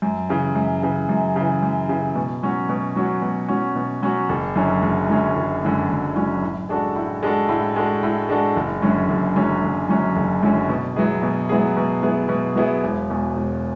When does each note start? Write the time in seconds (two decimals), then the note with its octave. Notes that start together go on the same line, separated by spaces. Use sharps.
0.02 F#2
0.29 C#3 E3
0.55 F#2
0.83 C#3 E3
1.09 F#2
1.36 C#3 E3
1.62 F#2
1.89 C#3 E3
2.15 B2
2.43 F#3 C#4 F#4
2.69 B2
2.96 F#3 C#4 F#4
3.22 B2
3.48 F#3 C#4 F#4
3.76 B2
4.02 F#3 C#4 F#4
4.29 F#1
4.56 F#2 D3 F#3 C#4
4.83 F#1
5.09 F#2 D3 F#3 C#4
5.36 F#1
5.63 F#2 D3 F#3 C#4
5.89 F#1
6.16 F#2 D3 F#3 C#4
6.42 A2
6.69 G#3 D4 F#4 A4
6.96 A2
7.23 G#3 D4 F#4 A4
7.49 A2
7.76 G#3 D4 F#4 A4
8.03 A2
8.29 G#3 D4 F#4 A4
8.56 F#1
8.82 F#2 D3 F#3 C#4
9.09 F#1
9.36 F#2 D3 F#3 C#4
9.62 F#1
9.89 F#2 D3 F#3 C#4
10.16 F#1
10.43 F#2 D3 F#3 C#4
10.69 B2
10.96 F#3 B3 E4 G#4
11.23 B2
11.49 F#3 B3 E4 G#4
11.77 B2
12.02 F#3 B3 E4 G#4
12.29 B2
12.56 F#3 B3 E4 G#4
12.83 E1
13.10 E2 B2
13.36 E1